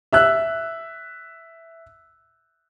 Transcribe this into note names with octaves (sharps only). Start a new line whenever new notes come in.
E5 E6 F#6